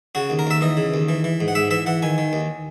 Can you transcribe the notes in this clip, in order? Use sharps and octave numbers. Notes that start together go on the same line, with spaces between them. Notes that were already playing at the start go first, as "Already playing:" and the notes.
C#3 F#4
D#2
A#4
D#2 E5
E3 D#5
C#3
D#2
E3
E3
G#2
F#5
G#2 E5
E3 E5
E3 F#5
D#3 G#5
D#3
D#2